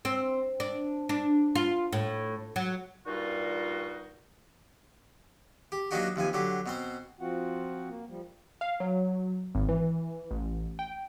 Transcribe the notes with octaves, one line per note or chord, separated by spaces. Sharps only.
C4
D4
D4
F4
A2
F#3
G2 A#2 G3 D#4 F4 F#4
G4
F#3 A#3 D4 D#4 F#4 G4
D#2 C3 F3 G#5
D3 F#3 G4
B2 C4 C5
F3 C4 F4 F#4 F#5
A#3
F3 G3
F5
F#3
G#1
E3
A1
G5